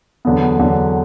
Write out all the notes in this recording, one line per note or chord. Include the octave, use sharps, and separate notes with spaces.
E2 D3 F#3 B3
E2 D3 F#3 B3